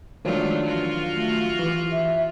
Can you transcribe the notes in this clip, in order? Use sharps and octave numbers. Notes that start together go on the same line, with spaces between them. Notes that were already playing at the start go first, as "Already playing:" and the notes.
D#3 F3 F#3 G#3 A3 D4 F4
E3 F4 F#4
A3
E3 G4
E5